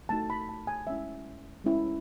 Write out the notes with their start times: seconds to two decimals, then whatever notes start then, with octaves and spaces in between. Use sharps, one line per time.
0.09 A3 D#4 F#4 A5
0.30 B5
0.49 A5
0.67 G#5
0.87 G#3 C#4 E4 E5
1.64 G#3 C#4 E4